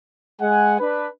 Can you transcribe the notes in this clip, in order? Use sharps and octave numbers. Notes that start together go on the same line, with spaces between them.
G#3 F#5 G#5
D4 B4